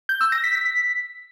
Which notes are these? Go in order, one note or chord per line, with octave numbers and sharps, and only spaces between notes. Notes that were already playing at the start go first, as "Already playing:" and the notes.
G6
E6
A#6
B6
B6